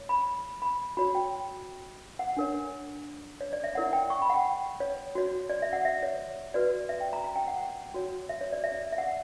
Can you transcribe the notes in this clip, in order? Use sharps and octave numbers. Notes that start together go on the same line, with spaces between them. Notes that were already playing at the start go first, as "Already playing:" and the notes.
Already playing: C#5
B5
B5
F#4 C#5 B5
G5
F#5
D4 A#4 C#5
C#5
D5
E5
E4 A#4 C#5 F#5
G5
C#6
B5
F#5
G5
C#5
F#4 C#5
D5
E5
F#5
E5
C#5
F#4 B4 D5
E5
G5
A#5
A#5
G5
F#5
F#4 C#5
E5
C#5
D5
E5
E5
F#5